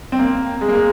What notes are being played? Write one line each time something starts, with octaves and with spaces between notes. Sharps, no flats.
C4
A#3
G#3
A#3
G#3